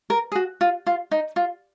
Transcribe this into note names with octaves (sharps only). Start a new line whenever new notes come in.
A#4
G#4
F#4
F4
F4
D#4
F4